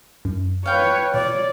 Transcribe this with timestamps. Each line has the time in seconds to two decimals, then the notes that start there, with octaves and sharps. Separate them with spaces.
0.25 F#2
0.66 B4 C#5 F5 G5
1.14 B2 C#5 D5